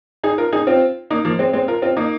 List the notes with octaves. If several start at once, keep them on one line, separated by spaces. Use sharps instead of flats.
D#4 G#4
F4 A#4
D#4 G#4
C4 F4
A#3 D#4
F3 A#3
G#3 C4
G#3 C4
F4 A#4
C4 F4
A#3 D#4